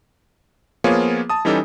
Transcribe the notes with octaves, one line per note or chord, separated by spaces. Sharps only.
F3 A#3 B3 F4 G#4 C#5
A5 D#6
E3 G3 C#4 D#4 G4 A4